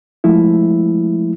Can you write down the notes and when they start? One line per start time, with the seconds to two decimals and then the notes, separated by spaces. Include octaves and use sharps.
0.24 F3 G#3 A3 E4